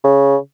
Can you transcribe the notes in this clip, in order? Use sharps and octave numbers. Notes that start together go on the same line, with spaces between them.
C#3